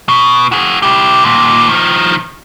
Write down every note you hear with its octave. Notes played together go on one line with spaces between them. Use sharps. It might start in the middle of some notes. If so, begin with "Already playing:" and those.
B2
F#4 G#4
E4 G4
D#2 A#2
D#3 F3